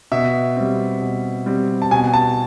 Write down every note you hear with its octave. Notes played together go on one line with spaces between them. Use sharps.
B2 E5
G3 C4
B2
G3 C4
A5
B2 G#5
A5